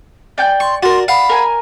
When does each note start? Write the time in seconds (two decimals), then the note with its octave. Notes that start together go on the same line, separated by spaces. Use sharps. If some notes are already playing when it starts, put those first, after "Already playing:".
0.38 D5 G5 G#5 G6
0.60 C6 C#6
0.83 F#4 A#4 D5 C6
1.08 F5 F#5 B5
1.29 A#4 G#5